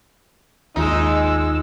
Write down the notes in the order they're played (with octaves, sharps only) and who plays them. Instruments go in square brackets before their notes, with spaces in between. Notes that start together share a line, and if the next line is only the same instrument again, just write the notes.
[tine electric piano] G#1 D#2 F4 [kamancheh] G#3 E6 [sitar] D#4